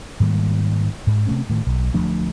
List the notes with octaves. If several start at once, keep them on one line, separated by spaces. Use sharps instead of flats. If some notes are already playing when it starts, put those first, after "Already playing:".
G#2 D#3 G3 A#3
G#2
C3 A3 C#4
A2 D#3
B1
D1 F3 A3 D4